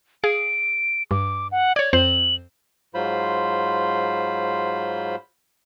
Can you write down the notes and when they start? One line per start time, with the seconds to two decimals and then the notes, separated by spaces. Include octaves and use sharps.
0.24 G#4 F5 D7
1.11 G2 D6
1.52 F#5
1.76 C#5 D5 G#6
1.93 F2 C4 C5 F#7
2.94 G#2 F#3 F4 C5 B5